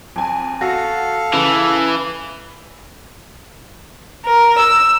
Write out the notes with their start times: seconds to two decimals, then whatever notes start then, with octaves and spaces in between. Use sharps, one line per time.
0.16 F2 G#5
0.61 F#4 A4 F5 A#6
1.33 C#3 E3
4.26 A#4
4.59 E6